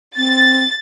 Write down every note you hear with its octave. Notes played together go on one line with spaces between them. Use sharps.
C4 A6